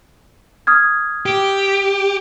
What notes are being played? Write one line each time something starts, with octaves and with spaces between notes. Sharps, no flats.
D#6 F6 G#6
G4